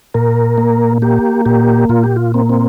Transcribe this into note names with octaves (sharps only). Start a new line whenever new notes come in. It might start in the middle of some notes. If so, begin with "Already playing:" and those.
A#2 A#4
A#3
A#3 G4
A#2 G4
A#2 F4
G4
F4
A#3 C4
C4